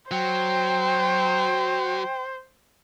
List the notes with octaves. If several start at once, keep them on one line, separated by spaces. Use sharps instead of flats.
F#3 C5 G5